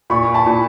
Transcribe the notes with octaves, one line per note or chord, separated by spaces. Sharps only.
A#2 B5 C#6
A5 B5
A#2